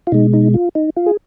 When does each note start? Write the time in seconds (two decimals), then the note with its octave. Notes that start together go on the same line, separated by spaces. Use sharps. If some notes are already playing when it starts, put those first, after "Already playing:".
0.07 F4
0.12 B2 G#3 D#4
0.34 D#4
0.54 F4
0.75 D#4
0.97 F4
1.06 G#4